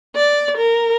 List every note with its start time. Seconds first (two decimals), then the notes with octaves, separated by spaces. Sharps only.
0.16 D5
0.58 A#4